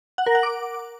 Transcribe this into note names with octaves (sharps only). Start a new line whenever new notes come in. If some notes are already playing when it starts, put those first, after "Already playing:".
F#5
A#4
F#5
D6